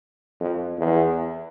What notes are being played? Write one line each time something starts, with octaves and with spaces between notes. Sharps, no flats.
F2
E2